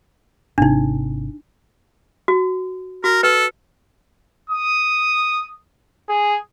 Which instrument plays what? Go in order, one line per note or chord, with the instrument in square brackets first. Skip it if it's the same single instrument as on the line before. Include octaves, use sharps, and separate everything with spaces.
[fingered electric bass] G#1 C3 [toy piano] D4 D#4
[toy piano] F#4
[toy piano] F#4 [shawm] A#4
[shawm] A4 [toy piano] B4
[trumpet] D#6
G#4